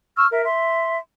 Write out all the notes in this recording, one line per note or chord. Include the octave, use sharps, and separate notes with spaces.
C#6 E6 F6
A#4 E5
E5 C6